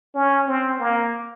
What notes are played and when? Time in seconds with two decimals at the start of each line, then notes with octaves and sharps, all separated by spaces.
0.15 C#4
0.48 C4
0.80 A#3